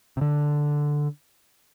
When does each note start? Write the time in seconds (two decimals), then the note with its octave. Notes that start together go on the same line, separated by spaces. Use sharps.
0.17 C3
0.21 D3